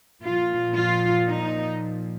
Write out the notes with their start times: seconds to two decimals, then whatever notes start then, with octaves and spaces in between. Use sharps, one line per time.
0.22 A#2 F3 F4
0.74 F4
1.27 D#4